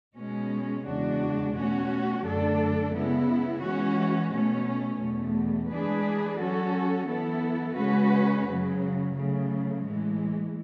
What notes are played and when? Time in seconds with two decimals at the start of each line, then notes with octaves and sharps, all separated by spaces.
0.16 B2 G#3 C#4
0.85 E2 C#3 G#3 D4 F#4
1.55 B2 A3 C#4 F#4
2.24 F#2 D3 A3 D4 A4
2.93 C#3 G#3 B3 E4
3.62 E3 G#3 C#4 F#4
4.31 B2 A3 C#4
5.00 E2 B2 A3
5.69 E3 G#3 D4 G#4 B4
6.39 F#3 C#4 F#4 A4
7.07 E3 B3 E4 A4
7.77 C#3 G#3 C#4 F#4 B4
8.46 F#2 C#3 F#3
9.16 C#3 F#3 A3
9.84 A2 E3 G#3